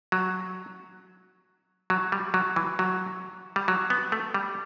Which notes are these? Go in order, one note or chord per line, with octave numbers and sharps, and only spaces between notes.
F#3
F#3
G3
F#3
E3
F#3
G3
F#3
B3
A3
G3